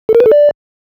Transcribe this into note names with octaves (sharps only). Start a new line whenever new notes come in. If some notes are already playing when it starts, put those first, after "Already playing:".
A4
A#4
B4
A4
D5